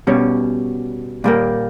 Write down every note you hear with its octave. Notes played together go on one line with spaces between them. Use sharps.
B2 G3 C#4
A#2 G3 A#3